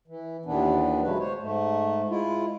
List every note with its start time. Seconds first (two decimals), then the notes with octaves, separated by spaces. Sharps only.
0.08 E3
0.46 D#2 A#2 D#3 E3 B3 D4
1.02 C#3 F#3 G#3 A3 B4
1.19 C5 C#5
1.41 G#2 A3
2.10 G#3 E4 F4